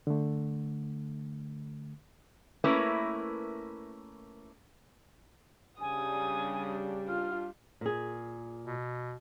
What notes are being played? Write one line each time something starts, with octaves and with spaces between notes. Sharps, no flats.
D3 A3
A3 A#3 C#4 E4 A#4 B4
C#3 G3 D4 G#5 D#6
F4 F6
A#2 G#4
B2